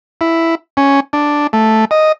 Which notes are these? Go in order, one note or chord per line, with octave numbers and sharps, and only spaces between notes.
E4
C#4
D4
A3
D#5